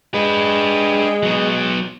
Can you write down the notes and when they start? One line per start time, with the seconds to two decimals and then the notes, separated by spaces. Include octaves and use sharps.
0.14 G#3 D4 B4
1.23 F#3 B3